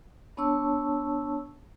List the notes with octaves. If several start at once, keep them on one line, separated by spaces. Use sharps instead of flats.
B3 D4 C#5 A5 C#6 E6